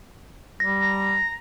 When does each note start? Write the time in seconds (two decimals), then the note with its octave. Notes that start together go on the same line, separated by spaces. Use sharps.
0.60 G3 A#6
0.81 A#5